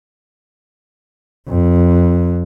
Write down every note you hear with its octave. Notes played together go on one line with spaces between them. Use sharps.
F2